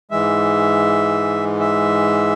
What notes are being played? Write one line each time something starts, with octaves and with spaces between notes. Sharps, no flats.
G#2 E3 G#3 E5
E5